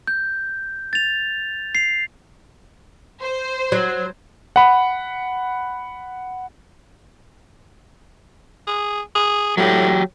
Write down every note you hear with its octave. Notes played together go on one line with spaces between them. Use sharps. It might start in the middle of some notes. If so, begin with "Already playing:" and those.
G6
A6 F7
C7 F7
C5
F#3
F#5 B5
G#4
G#4
A2 F#3 G4